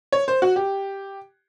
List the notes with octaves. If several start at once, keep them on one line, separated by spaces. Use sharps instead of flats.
C#5
C5
F#4
G4